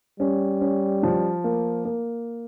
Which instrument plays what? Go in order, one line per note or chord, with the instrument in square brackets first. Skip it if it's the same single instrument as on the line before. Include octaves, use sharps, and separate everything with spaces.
[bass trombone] G3 [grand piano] C#4
[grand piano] C#4
F3
A#3
A#3